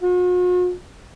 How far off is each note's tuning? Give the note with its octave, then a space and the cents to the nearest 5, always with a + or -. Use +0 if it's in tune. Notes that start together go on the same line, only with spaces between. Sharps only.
F#4 -45